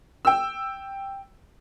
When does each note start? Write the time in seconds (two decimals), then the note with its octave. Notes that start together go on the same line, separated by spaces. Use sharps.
0.25 G5 E6